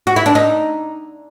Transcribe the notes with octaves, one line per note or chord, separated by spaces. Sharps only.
F#4
E4
D4
D#4